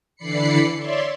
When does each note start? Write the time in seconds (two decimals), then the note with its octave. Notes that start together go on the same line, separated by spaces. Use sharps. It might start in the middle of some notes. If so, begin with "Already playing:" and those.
0.16 D3 E3 D5 B5 C7 C#7
0.77 C#5 D5 E5 C6